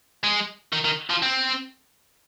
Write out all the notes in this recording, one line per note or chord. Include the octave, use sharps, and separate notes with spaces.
G#3
D#3
D#3
F3
C4